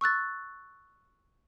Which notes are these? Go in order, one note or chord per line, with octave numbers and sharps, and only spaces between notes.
C#6 E6 F#6 A6